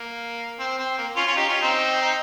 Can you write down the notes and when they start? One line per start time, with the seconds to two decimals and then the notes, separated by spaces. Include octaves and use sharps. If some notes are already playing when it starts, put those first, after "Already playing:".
Already playing: A#3
0.60 C4
0.79 C4
0.98 A#3
1.17 C#4 F4
1.27 C#4 F4
1.36 D#4 G4
1.49 C#4 F4
1.61 C4 D#4
2.01 D#4